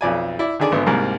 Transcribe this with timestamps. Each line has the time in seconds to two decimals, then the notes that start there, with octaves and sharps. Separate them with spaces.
0.01 B1 F2 D5 G#5
0.39 E4 D5
0.60 D3 D#3 G#4 D5
0.72 G#1 D3 B3
0.86 C2 G#2 G3 A#3